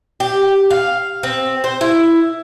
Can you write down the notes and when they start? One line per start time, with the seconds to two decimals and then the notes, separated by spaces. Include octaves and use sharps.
0.20 G4
0.70 F5
1.23 C4
1.64 C5
1.81 E4